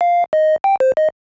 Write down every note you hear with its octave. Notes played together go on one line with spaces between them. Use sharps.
F5
D#5
G5
C5
D#5